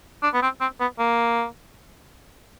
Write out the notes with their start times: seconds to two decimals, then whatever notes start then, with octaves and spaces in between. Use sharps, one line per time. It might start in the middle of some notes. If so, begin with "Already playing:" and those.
0.23 D4
0.34 B3
0.42 C4
0.61 C4
0.80 B3
0.99 A#3